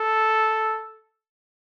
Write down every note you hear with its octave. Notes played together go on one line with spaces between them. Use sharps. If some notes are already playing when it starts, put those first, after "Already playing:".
Already playing: A4